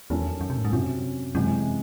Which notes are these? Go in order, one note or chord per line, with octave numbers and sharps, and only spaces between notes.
E2 D#3 F#3 C#4 F#4 A4
F#2
C3
A2
G#2
F#2 C3 F#3 C#4
F#2 C3 E3 G#3